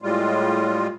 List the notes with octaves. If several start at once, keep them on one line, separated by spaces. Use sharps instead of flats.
A2 G3 G#3 F4